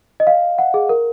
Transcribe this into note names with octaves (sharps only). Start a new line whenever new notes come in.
D#5
F5
F#5
G#4
A#4